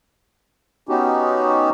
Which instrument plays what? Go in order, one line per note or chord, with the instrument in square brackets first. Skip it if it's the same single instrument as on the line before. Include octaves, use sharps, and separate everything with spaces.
[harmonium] B3 C#4 D#4 F#4 G4